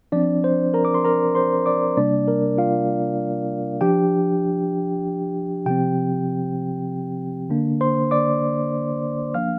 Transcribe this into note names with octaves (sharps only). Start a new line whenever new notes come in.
F3 C4 D4 D5
C5
A#4 A#5
D6
C6
A#4 A#5
C5 C6
D5 D6
C3 G3 A#3 D4 D5
A#4
F4 F5
F3 D4 G4 G5
C3 F3 C4 G4 G5
D3 A#3 D4
C5 C6
D5 D6
F3 A#3 D4 F5 F6